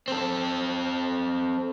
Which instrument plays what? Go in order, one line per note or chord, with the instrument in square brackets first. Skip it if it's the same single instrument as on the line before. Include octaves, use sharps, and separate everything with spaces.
[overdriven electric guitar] C4 A4